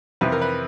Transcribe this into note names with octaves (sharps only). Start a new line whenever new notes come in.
F2 C3 E3 B4
A#4
B4